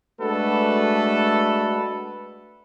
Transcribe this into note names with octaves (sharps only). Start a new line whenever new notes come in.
G#3 A3 D4 F#4 A4 B4